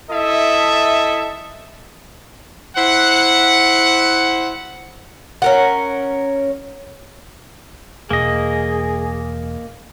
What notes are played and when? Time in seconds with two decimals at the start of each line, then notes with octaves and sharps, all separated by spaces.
0.10 E4 A4 D#5 E5
2.76 E4 C5 F#5
5.42 C#4 A#4 F#5
8.11 E1 A#3 G#4 D#5